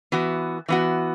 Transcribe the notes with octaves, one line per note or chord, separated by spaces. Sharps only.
E3 B3 F#4
E3 B3 F#4